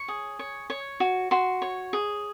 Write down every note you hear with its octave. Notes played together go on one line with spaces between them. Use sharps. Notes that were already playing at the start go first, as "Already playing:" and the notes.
Already playing: C#5 C#6
G#4
C#5
C#5
F#4
F#4 C6
C#5
G#4